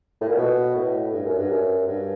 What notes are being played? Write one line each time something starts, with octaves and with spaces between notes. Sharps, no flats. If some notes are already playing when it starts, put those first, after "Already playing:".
A2
A#2
B2
A2
G2
F#2
G2
F#2
G2